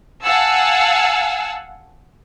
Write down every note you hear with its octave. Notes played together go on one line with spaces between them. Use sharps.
F5 F#5 G#5 A5 E6